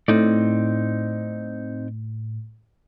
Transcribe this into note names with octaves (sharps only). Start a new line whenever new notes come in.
A2 C4 D#4 D5